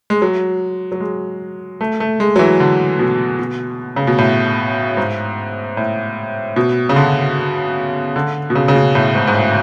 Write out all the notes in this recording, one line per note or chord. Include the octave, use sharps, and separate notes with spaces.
G#3
F#3
F#3
G#3
A3
A3
G#3
F#3
E3
D3
B2
B2
C#3
B2
A2
G#2
A2
B2
C#3
D3
D3
B2
C#3
C#3
B2
A2
G#2
G#2
A2